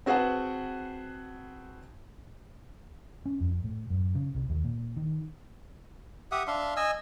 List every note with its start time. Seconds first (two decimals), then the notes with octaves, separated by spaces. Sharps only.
0.06 C4 F#4 G#4 B4 F#5 A5
3.26 C#4
3.40 F2
3.64 A2
3.90 F#2
4.15 C#3
4.35 C2
4.49 D#2
4.64 A#2
4.97 D#3
6.32 G4 E5 F#5 D#6
6.47 D4 E5 F5 C6
6.76 D#5 G#5 E6